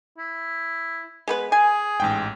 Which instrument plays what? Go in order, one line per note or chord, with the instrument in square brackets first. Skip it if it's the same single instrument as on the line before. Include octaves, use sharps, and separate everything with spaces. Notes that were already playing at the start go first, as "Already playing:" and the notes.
[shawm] E4
[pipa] G#3 B3 B4
[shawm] G#4 [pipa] G#5
[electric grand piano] A1 G#2 G5